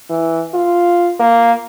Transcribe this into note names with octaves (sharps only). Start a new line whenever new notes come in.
E3
F4
A#3